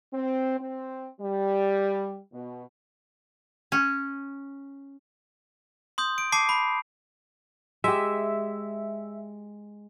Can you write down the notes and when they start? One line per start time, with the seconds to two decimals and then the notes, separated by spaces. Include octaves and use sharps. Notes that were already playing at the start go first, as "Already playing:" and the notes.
0.12 C4
0.59 C4
1.20 G3
2.33 B2
3.72 C#4
5.98 C6 D#6 G6
6.18 D7
6.32 A5 D6 C7
6.49 B5 D6
7.84 G#3 G4 E5